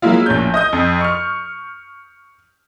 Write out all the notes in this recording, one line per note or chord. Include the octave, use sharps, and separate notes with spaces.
F#3 G#3 A#3 E4 F4
A#1 A2 C#4 G6
D#5 D#6 G6
F2
C#6 F6